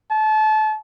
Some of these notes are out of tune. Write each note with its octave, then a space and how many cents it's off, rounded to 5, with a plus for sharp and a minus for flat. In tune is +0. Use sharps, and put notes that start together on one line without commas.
A5 -30